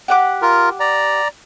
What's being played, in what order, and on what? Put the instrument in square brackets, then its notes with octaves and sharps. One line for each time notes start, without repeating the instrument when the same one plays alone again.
[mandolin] G4 F#5 D6
[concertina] F4 A#4
D5 A#5